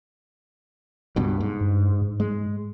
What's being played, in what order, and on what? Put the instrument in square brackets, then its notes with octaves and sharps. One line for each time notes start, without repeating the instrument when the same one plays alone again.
[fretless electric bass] C#2 G2 B2
G#2
[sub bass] G2
G#2
[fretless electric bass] G#3